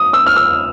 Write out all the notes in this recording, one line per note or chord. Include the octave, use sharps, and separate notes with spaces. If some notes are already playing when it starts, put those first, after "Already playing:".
Already playing: D#6
E6
F6
E6